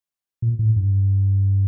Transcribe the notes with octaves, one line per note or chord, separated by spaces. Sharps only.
A#2
A2
G2